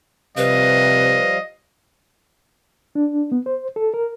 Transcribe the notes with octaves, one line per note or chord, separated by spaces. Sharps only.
C3 F3 G3 B4 D#5 F5
D4
B3
C5
A4
A#4